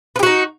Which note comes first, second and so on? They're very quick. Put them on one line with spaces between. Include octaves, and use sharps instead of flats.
B4 G4 F#4 D#4